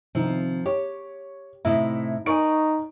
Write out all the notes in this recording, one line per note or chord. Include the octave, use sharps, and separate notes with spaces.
C2 D#3 F3 C4
G4 C#5
A2 C3 D#4 E4
D#4 A#4 D5 G#5 C#6 D7